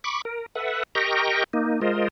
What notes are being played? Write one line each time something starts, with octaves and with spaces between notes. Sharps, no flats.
B5 C#6 D6
A#4
A4 B4 E5 F#5
G4 A#4 D#5 G5 A#5 C#6
A#3 D#4
G#3 F4 A#4 C5 D#5